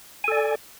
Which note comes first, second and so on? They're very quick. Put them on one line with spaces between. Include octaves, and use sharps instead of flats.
G#5 A4 D5